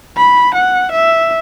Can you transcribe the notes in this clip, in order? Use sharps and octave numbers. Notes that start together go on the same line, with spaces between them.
B5
F#5
E5